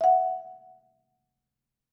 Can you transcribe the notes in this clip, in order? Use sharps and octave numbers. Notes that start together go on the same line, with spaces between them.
E5 F#5